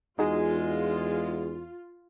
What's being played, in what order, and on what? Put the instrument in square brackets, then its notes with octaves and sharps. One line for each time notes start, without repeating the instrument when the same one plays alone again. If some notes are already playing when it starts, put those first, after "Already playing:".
[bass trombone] E2 [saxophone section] G#3 [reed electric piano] D#4 F#4 G#4 [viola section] F4